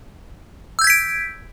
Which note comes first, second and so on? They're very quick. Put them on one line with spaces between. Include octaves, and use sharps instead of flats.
E6 G6 G#6 B6 D7